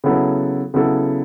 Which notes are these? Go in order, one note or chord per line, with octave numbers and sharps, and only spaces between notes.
C#3 F#3 B3 E4 A4
C#3 F#3 B3 E4 A4